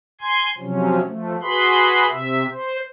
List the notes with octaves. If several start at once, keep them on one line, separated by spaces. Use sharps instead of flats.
G#5 C6 G#6
C3 F3 F#3 C#4
F3 A3
F#4 G#4 B4 B5 C6
C3 E5
C5